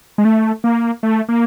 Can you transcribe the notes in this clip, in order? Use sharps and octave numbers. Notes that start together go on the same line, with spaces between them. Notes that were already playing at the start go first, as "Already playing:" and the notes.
G#3
A3
A#3
A3
A#3